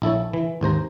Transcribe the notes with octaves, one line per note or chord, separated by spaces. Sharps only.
A#1 E4 A4 C#5
E3
G#1 D#2 C5 A#5